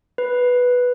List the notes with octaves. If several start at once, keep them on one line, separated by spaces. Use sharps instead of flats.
B4